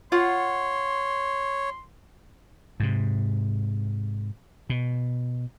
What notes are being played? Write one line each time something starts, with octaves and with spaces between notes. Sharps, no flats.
F4 C#5 F#5 C6
G#2 C3
B2